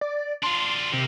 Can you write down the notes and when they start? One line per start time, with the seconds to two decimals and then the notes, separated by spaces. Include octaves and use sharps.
0.01 D5
0.43 D4 F4 C6
0.93 C3 A#3 G4